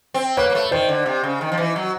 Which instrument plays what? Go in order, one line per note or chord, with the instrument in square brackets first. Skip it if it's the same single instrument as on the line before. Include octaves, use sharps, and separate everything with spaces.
[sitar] C4
[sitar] A#3 [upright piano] B4 C#5
[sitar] A#3
A3
[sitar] D#3 [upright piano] C5 D5
[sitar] D3
C3
C#3
D#3
F3
E3
F#3